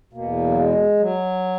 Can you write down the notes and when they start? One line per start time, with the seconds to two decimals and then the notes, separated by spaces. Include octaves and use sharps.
0.13 E2 B2 A#3
0.49 F#3
0.57 G#3
0.99 F#3